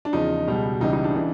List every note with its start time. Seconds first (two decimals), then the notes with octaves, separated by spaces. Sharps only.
0.05 D4
0.13 E2 C#3 F3 D#4
0.47 C#2 B2 G3
0.81 C#2 C#3 E3 G3 D#4
0.93 D#4
1.04 D4
1.15 C#3 E3